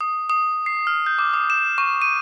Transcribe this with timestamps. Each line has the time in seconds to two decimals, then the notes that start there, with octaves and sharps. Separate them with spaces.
0.01 D#6
0.30 D#6
0.66 C7
0.87 F6
1.06 G6
1.19 D6
1.34 D#6
1.50 E7
1.78 C#6
2.02 D#7